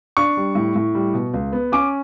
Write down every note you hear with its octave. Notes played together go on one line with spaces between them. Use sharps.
D4 C#6
G3
A2
A2
G3
B2
C#2
B3
C#4 D6